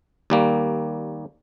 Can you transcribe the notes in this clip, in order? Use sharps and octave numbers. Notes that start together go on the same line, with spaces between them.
D#2 G3 A#3